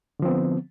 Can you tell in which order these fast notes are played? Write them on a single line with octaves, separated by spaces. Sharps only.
D3 F3 C4 B3